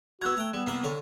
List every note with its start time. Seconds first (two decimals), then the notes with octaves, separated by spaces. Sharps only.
0.21 B3 F#4 A#5 E6 F#6 G#6
0.37 A3 G5 A#5
0.53 G3 B3 E7
0.66 C2 A#3 F#5
0.83 D3 C#5